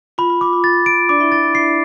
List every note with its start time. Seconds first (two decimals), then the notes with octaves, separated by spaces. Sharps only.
0.18 F4 B5
0.30 F4
0.41 F4 D6
0.53 F4
0.64 A6
0.86 D7
1.09 D4 D5 D6
1.20 E4 E5
1.32 E4 E5 A6
1.43 E4 E5
1.54 E4 E5 C7